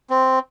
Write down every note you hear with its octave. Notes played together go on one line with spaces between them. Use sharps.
C4